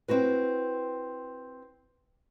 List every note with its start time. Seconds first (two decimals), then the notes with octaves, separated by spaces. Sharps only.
0.08 C4 E4 F#4 B4